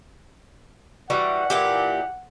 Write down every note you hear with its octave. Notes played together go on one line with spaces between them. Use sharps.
E3 G3 F#4 F#5
A#2 E3 G4